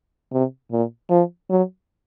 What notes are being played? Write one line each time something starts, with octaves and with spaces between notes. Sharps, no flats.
C3
A#2
F3
F#3